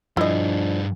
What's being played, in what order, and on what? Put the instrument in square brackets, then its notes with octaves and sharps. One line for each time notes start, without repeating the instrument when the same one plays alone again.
[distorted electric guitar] G2 G#4 [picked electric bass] F3 [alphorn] D4 [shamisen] E4 D#5